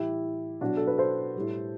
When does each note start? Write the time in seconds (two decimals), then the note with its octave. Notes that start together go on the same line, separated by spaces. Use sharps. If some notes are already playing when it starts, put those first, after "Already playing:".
Already playing: A2 E3 G3 E4 G4
0.61 B2 F#3 D4 F#4
0.77 A4
0.87 B4
0.98 A4 C5
1.36 A2 G3